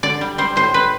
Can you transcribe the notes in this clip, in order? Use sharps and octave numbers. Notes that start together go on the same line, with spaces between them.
D3 D5
G3
G3 C5
A2 C5
A2 B4